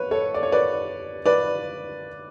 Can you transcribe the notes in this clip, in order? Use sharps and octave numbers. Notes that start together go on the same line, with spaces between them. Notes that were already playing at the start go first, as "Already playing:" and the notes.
Already playing: B4 C#5
A4 C#5
D5
C#5
B4 D5
B4 D5